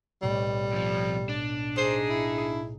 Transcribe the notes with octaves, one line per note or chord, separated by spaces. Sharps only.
B1 A2 G3
F2 F3
D4
D#4 G#4 C5
E4